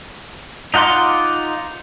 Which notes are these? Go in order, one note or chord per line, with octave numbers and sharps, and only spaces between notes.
D#4 F4 F#5 C6 D6